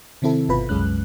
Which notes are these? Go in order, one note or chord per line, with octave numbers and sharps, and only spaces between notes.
C3 D#3 C4 E4 A4
G1 B2 F4 B4 B5
C2 F#2 G#3 C#4 F#6